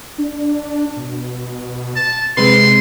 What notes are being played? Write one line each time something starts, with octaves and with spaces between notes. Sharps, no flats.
D4
B2
A5
C3 G#3 C4 B4 C6